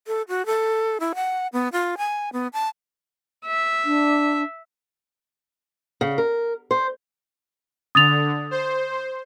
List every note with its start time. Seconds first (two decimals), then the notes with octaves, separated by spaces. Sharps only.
0.07 A4
0.28 F#4
0.46 A4
1.00 E4
1.15 F#5
1.53 B3
1.72 F4
1.98 G#5
2.33 B3
2.53 A5
3.46 E5
3.85 D4
6.01 C#3
6.18 A#4
6.71 C5
7.95 D3 D#6 A6 F7
8.51 C5